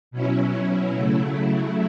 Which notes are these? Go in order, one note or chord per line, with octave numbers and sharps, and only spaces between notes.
B2 F#3 C#4 E4
C#3 F#3 A3 E4